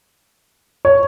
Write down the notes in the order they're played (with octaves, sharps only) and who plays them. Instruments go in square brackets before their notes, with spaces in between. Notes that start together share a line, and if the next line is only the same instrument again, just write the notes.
[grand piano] C#5